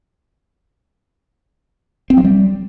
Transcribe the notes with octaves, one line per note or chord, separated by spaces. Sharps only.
C4
F#3
G3